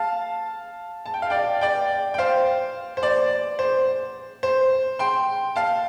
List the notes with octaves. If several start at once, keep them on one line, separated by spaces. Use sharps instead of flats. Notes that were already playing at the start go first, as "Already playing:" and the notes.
Already playing: F5 A5
A5
G5
F5
D5 G5
D5 G5
G5
C5 F5
C5
D5
C5
C5
G5 C6
F5 A5